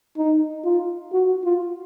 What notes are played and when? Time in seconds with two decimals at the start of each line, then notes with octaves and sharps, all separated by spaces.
0.17 D#4
0.65 F4
1.12 F#4
1.44 F4